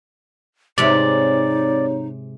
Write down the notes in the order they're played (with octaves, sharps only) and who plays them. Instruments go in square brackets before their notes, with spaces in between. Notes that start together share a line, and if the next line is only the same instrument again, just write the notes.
[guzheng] G#2 C3 [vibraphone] C4 G4 C#5 [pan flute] D#4 [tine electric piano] D5